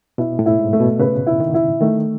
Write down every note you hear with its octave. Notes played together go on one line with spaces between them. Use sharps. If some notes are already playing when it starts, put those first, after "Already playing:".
B2 E4
A2
E4
G#2
A3
B2
C#3 B4
E4
D#3
E4
D#3 A3